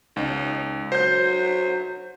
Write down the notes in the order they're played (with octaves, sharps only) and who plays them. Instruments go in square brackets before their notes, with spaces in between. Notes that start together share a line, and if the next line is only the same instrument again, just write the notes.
[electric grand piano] C#2 [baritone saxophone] D#4
[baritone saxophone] F#3 [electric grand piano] C5 G6